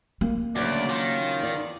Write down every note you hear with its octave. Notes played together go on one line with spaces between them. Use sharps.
A#3
D2 C#3 F#3 D5
D#3 F4
E2 D5